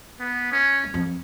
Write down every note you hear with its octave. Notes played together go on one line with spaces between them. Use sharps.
B3
C#4
F#2
F2